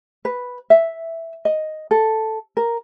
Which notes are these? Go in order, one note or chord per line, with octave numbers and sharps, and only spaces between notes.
B4
E5
D#5
A4
A#4